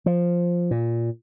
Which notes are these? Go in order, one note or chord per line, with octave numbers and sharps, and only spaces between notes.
F3
A#2